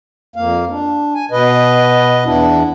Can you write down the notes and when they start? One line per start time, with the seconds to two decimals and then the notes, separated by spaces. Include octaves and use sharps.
0.36 F2 A#3 F5
0.70 D4
1.15 G#5
1.31 B2 B4 D#5
2.25 E2 B3 D4 E4